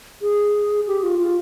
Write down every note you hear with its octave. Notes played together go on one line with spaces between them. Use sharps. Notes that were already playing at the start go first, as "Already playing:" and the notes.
G#4
G4
F4
F4